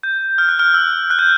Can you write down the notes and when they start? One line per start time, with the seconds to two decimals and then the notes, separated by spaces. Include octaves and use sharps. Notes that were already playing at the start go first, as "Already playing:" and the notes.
0.03 G6
0.38 F6
0.49 F#6
0.59 F6
0.74 E6
1.10 F#6
1.19 G6